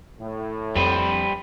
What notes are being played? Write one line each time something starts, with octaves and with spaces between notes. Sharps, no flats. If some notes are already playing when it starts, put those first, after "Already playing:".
A2
F2 G3 B4 C5